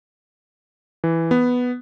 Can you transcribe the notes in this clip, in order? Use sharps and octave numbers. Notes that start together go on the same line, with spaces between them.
E3
B3